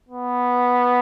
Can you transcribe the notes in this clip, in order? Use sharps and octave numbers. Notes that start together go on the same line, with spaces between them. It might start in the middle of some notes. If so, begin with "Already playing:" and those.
B3